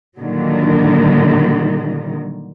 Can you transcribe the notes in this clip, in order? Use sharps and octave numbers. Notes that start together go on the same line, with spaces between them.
A#2 D3 D#3 F#3 G3